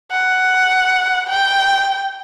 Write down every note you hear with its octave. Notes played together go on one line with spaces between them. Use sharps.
F#5
G5